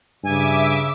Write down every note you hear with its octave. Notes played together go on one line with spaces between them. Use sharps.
G2 C#3 E5 G#5 D6